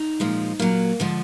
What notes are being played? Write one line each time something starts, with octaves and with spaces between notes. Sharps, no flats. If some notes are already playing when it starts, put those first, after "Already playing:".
Already playing: D#4
A#2 F3 G#3
A#2 F#3 A#3
D3 F3 G#3